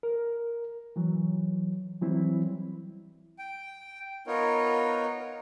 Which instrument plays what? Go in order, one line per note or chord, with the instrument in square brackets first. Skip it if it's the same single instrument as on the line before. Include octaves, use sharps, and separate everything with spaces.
[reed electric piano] A#4
E3 F#3
E3 F#3 G3 C4 E4
[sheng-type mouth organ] G5
B3 D#4 F4 A#4 C#5